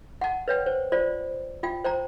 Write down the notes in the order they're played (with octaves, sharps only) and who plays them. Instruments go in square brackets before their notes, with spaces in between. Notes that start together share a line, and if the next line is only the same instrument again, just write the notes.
[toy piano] F#5 A5
B4 C#5 G5
C5
F4 C5 D5
F4 G5
C5 G5 A5 A#5